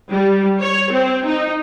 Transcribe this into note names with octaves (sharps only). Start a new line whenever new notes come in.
G3
C#5
C4
D#4